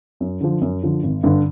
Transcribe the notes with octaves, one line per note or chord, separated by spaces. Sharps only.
F#2
D3 F3
F#2
D3 F3
G#1
G2 D3